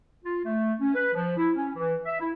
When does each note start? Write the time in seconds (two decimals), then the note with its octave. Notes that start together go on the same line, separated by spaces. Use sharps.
0.24 F4
0.45 A3
0.80 C#4
0.94 B4
1.14 F3
1.36 E4
1.55 C#4
1.76 E3
2.05 E5
2.20 E4